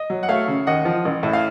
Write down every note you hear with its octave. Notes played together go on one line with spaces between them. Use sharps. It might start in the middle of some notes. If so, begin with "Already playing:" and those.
Already playing: D#5
F#3
F#5
A3 C#5 F5
C#3
D#2 D#5 F#5
F3
A1
A2
F5